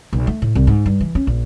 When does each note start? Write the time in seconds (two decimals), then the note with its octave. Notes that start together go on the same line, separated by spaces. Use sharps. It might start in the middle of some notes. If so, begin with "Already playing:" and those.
0.13 B1
0.27 A3
0.42 A2
0.55 C2
0.67 G#2
0.86 G2
1.01 E3
1.15 C#4
1.27 A#1